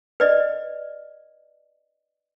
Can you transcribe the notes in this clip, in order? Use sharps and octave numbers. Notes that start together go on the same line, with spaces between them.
B4 D5 D#5